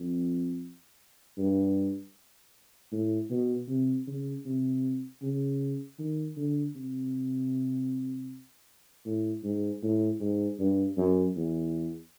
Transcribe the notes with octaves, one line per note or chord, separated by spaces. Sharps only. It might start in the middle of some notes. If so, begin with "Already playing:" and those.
Already playing: F2
G2
A2
B2
C3
C#3
C3
C#3
D#3
D3
C3
A2
G#2
A2
G#2
G2
F#2
E2